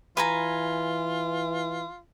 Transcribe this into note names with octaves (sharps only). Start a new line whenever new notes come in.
E3 F4 B4 G#5 A#5